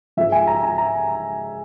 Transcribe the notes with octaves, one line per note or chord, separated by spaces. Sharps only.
G#2 F3 G#3 E5
G#5
A#5
A#5
A#5